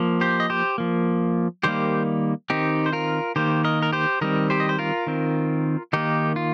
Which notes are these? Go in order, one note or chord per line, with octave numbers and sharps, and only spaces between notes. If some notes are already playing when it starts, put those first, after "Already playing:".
Already playing: F3 A#3
G4 C5
D#5
G4 C5
F3 A#3
D#3 G3 A#3 G4 C5
D#3 C4 D#4 G4
C5
F4 A#4
D#3 A#3 G4 C5
A#4 D#5
A#4
G4 C5
D#3 G3 C4 A#4 D#5
G4 C5
D#5
C5
F4 A#4
D#3 C4
D#3 A#3 D#4 G4
F4